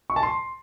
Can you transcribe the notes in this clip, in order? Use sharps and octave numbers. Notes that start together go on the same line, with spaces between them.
C#6
A5
C6